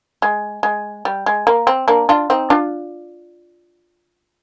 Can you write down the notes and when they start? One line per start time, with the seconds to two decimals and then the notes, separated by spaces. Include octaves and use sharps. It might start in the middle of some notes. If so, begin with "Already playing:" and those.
0.22 G#3
0.63 G#3
1.05 G3
1.26 G#3
1.47 A#3
1.67 C4
1.88 A#3 D4
2.09 D4 F4
2.30 C4 D#4
2.50 D4 F4